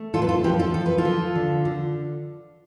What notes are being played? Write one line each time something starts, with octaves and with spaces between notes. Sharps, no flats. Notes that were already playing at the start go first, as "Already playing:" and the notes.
Already playing: A3
A2 F4 A4
B4
F4 A4
F3 G4 B4
F4 A4
F3 A4
B4
F4 A4
F3
D3
D3